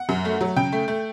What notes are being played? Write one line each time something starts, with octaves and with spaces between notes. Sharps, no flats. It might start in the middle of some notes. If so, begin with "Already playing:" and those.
Already playing: F#5
F#2
A3
F#3
C#3 G5
A3
A3